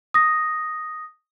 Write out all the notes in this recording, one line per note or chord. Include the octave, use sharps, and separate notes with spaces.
D#6 A#6